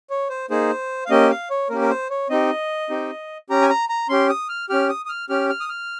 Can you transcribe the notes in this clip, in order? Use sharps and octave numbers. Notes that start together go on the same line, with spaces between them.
C#5
C5
A#3 D#4 G#4 C5
F5
A#3 C#4 G4 D#5
F5
C#5
A#3 C#4 G4 A#4
A#4
C5
C#5
C4 D#4 G4 D#5
C4 D#4 G4
C#4 G4 A#5
G#5
A#5
A#5
C#4 G4 C6
D#6
F6
C#4 G4 F6
D#6
D#6
F6
C#4 G4 F6
F6
D#6
F6